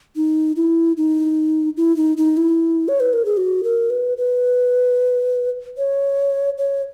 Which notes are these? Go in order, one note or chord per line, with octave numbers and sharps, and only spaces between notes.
D#4
E4
D#4
E4
D#4
D#4
E4
C#5
B4
A#4
G#4
F#4
A#4
B4
B4
C#5
C#5